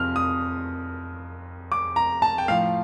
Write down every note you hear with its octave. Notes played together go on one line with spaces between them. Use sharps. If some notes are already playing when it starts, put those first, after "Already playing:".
Already playing: F2 C3 F3 F6
D#6
D6
A#5
A5
G5
A2 F3 F5